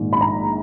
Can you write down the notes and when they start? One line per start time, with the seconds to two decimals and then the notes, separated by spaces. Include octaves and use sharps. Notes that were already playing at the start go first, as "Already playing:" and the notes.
Already playing: A#1 G#2 D#3
0.13 B5
0.21 A#5